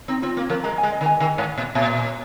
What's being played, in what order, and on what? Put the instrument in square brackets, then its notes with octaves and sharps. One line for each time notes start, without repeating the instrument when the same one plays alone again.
[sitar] C4 [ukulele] D#4
[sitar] C4 [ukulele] F4
[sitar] A#3
[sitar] F3 [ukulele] A#4
[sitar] G#3 [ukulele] A#5
[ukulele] G#5
[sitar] G#3
[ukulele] D#5
[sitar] D#3
[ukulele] G#5
[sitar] D#3
G#2
A#2
[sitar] A#2 [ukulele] A#5